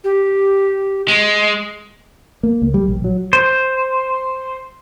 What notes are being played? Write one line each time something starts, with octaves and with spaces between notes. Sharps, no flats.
G4
G#3
A#3
C#2
G3
A#1
F#3
C5